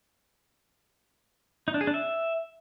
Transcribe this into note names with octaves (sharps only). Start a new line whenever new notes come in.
D#4
D4
G#4
D4
E5